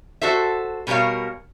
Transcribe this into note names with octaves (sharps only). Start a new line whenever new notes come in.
F#4 A4 C5 E5
B2 G3 A#4 C#5 F5